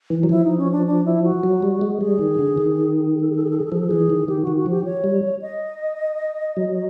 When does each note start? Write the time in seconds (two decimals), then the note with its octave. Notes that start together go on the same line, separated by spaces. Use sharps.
0.10 E3
0.23 F#3
0.29 F3 E4
0.44 D#4
0.58 C#4
0.72 D4
0.86 D4
1.05 E4
1.24 F#4
1.43 F#3
1.62 G3
1.81 G#3
2.00 G3 G#4
2.19 D#3
2.39 D3
2.57 D#3
3.14 G#4
3.21 A4
3.29 G#4
3.36 A4
3.44 G#4
3.50 A4
3.58 G#4
3.65 A4
3.72 F3 G#4
3.80 A4
3.87 E3 G#4
4.10 D#3
4.28 D#3 G4
4.43 D#3 F#4
4.56 F#4
4.66 F3 G4
4.85 C#5
5.04 G3
5.42 D#5
6.56 F#3